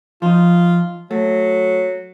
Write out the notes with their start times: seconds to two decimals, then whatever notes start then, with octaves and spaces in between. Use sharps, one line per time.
0.22 F3 D#4 F4
1.11 F#3 A3